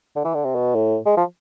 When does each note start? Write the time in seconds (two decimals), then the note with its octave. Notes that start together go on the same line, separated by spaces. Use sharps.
0.16 D3
0.25 E3
0.34 D3
0.45 C3
0.55 B2
0.75 A2
1.06 G#3
1.17 F3